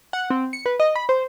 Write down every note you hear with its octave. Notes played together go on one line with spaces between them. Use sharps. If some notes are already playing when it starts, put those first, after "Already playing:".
F#5
C4
C#7
B4
D#5
B5
C5